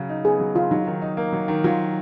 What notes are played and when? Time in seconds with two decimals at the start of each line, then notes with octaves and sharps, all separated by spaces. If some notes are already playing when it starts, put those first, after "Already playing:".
Already playing: C#3 F#3
0.09 D#4
0.24 B3 G#4
0.40 F#3
0.55 C#3 F4
0.71 F#3 D#4
0.87 D#3
1.02 D#4
1.17 A#3
1.33 F#3
1.48 D#3
1.64 F#3 F4